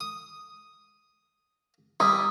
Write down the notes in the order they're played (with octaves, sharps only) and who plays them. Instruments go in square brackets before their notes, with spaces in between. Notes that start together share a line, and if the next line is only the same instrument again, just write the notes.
[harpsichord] D#6
[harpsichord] G3 E4 [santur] D#6